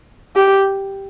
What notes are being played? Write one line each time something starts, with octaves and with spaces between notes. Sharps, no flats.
G4